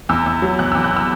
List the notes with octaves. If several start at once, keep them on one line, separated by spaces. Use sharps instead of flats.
E2 E6
E2
F#3
E2 F#6
E2 E6
F#6
E6